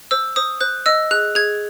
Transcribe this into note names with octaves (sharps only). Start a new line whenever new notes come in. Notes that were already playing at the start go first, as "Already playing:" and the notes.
C5 E6
C5 D#6
C5 F#6
D#5 E6
G#4 F#6
G#4 G#6